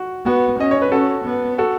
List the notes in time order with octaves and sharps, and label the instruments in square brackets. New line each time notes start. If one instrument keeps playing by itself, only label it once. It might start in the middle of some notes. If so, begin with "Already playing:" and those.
Already playing: [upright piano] F#4
[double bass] B3 [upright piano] F#4
[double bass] C#4 [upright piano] D#5
[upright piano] C#5
B4
[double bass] C#4 [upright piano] F#4 A4
[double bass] B3
[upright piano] F#4 A4